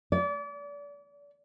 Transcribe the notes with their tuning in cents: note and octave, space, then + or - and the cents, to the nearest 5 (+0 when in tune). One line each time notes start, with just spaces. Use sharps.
D5 -35